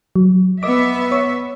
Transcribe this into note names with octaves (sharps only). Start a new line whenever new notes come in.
F#3
B3 D#5 E5 D6
C#5 C#6